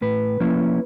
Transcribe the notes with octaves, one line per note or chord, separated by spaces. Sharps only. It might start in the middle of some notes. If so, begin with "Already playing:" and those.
A2 B4
F3 A#3 C#4 E4